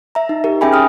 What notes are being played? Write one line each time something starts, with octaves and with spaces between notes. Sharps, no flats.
E5 A#5
D#4
G4 A#4
C#4 G#4 E5 G5 G#5 B5
D#6 F6